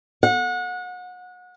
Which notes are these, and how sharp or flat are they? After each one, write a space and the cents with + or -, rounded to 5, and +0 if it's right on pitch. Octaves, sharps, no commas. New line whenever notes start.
F#5 -30